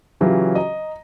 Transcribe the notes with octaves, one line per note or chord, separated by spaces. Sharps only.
C#3 E3 F#3 C#4 F4 G4
D#5 A#5